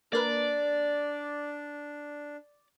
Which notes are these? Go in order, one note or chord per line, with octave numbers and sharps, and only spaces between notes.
A#3 D4 A#4 B4 D5